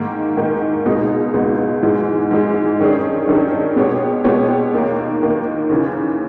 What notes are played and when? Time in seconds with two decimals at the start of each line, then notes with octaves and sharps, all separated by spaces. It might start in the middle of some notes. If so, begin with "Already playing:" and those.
Already playing: G#2 D#3 A#3
0.37 G#2 D#3 A#3
0.85 C#2 B2 G#3 B3 D#4
1.34 C#2 B2 G#3 B3 D#4
1.83 G#2 E3 G#3
2.31 G#2 E3 G#3
2.79 G2 D#3 G3 C#4 G#4
3.27 G2 D#3 G3 C#4 G#4
3.76 B2 G#3 B3 G4 C#5
4.24 B2 G#3 B3 G4 C#5
4.74 D#2 D#3 A#3
5.21 D#2 D#3 A#3
5.70 D#2 C#3 E3